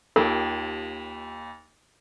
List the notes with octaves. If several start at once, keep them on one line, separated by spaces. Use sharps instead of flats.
D#2 F4 G4 G#4 A#4